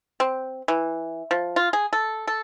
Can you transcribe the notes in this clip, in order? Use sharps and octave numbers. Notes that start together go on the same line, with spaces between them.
C4
E3
F3
F4
G#4
A4
A4